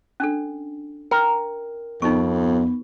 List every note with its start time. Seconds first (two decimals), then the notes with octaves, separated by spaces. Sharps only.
0.20 C#4 D4 A4
1.11 A#4 G5
2.02 F2 B3 D#4 C#6